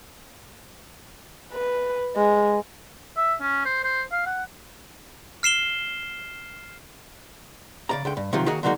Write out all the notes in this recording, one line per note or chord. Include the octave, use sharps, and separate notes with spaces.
B4
G#3
E5
C#4
C5
C5
F5
F#5
F6 C7 E7 G7
C#3 D5 A#5
C#2 D3 G5
G2
C3 D#3 F3 F#3
D#3 A#3 F#4 G#4 C#5 D#5
D3 F#3 G#3 A#3 D#4 F#4